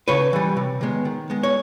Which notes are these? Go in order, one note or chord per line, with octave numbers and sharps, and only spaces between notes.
C#3 B4 C#5
E3 G3
C3
D#3 G#3 B3
D#3
G#3 B3
C#5